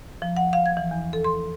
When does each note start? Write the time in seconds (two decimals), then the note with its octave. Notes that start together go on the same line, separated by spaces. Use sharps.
0.22 F3
0.37 F#5
0.53 F5
0.66 G#6
0.77 E3
0.91 E2
1.13 A4
1.24 C6